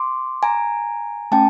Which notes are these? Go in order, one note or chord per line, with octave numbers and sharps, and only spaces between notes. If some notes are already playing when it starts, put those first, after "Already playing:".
Already playing: C6 D6
G#5 A#5
A3 C#4 G5 A5